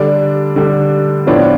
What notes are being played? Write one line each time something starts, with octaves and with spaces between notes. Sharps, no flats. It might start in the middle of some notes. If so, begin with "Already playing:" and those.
Already playing: D3 G3 D4
D3 G3 D4
A2 F3 B3 D4